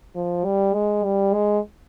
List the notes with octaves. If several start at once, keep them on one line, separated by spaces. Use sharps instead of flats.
F3
G3
G#3
G3
G#3